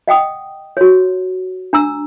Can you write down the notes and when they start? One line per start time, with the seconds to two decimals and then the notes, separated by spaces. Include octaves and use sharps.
0.08 D#5 F#5 G5 D#6
0.77 F#4 C#5
1.73 D4 A#5 E6